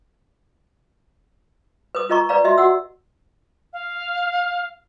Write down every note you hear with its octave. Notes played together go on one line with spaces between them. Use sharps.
B4 D#6
F4 A#4 D#5 A#5 C#6
B4 D5 F5 A#5
F#4 D#5 E5 C6
F#4 F#5 E6
F5